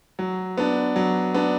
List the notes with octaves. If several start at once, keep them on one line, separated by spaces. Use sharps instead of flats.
F#3
B3 D4
F#3
B3 D4